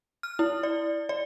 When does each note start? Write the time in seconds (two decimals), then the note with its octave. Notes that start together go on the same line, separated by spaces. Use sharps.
0.23 F6
0.39 E4
0.63 D5
1.09 D5